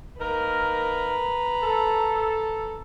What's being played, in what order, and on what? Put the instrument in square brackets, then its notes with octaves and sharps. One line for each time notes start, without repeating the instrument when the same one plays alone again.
[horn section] A#3 D#4 A#4 [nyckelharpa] B4 A#5
[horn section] A4